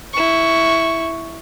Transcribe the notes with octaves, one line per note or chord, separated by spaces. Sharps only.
E4 C#6